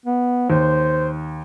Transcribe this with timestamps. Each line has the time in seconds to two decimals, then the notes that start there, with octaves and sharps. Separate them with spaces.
0.06 B3
0.50 D#2 C5